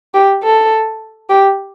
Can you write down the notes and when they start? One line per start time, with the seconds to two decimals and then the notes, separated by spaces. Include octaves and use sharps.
0.14 G4
0.43 A4
1.29 G4